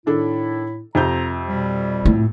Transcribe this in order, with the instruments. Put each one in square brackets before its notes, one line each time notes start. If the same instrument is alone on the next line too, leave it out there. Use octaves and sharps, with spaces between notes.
[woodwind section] A2 E4 [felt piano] D#3 D4 A4
[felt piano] F2 C3 G6 [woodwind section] A#5
[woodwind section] B2 G3
[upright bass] A2